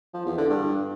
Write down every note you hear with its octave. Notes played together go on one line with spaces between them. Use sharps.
F3
E2
D3
G2